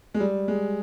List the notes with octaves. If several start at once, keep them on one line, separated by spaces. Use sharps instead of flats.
G#3
G3
G#3